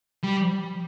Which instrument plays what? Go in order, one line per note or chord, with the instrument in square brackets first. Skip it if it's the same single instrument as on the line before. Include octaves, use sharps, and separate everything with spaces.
[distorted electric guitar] G3